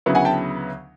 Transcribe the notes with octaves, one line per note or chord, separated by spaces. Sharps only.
D2 C#3 F#3 B3 E4
F#5 G#5
G5 A5